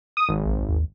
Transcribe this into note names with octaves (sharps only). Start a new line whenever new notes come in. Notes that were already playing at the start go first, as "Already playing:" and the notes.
D#6
G#1
A#1
D#2